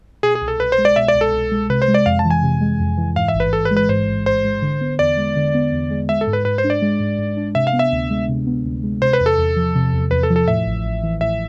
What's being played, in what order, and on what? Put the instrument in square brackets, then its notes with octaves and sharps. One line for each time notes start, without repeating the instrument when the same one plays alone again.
[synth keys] B2 [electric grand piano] G#4
[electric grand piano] G#4
[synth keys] C2
[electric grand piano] A4
[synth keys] C2 [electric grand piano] B4
[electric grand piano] C5
[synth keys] G#3
[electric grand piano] D5
[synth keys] B2 [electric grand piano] E5
[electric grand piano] D5
[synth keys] C2
[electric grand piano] A4
[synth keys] C2
G#3
[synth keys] C3 [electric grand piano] B4
[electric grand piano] C5
[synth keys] G#3
[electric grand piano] D5
[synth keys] F2 [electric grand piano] F5
[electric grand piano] A5
[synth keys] E3
[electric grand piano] G#5
[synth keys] C3
G#3
F2
E3
[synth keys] G#2 [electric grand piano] F5
[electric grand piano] E5
[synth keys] A1
[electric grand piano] B4
[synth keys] A1 [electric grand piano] A4
[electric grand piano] B4
[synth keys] G#3
[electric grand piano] B4
[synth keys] G#2 [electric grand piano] C5
[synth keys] A1
[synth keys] A1 [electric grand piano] C5
[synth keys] G#3
D3
B3
[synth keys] E2 [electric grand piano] D5
[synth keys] G#3
D3
B3
E2
G#3
[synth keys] G#3 [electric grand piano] E5
[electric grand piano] A4
[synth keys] G#2
[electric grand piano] B4
[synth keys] G#2 [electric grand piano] B4
[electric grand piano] C5
[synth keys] D4
[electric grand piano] D5
[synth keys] G#3
G#2
G#2
D4
[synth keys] C3 [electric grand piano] E5
[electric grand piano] F5
[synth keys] B3
[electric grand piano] E5
[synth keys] D2
G#3
C3
B3
D2
G#3
[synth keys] C3 [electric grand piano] C5
[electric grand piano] B4
[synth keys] E2
[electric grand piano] A4
[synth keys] E2
F3
C3
E2
[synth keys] E2 [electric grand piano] B4
[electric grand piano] A4
[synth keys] F3
[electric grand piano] A4
[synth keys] A2 [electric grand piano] E5
[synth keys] A1
A1
E3
[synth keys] A2 [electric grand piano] E5